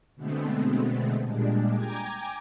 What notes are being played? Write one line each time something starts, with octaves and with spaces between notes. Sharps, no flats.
B2 D3 G#3 A3 B3 C4
A#2 G3 G#3 D4
G5 G#5 A#5 D6 G#6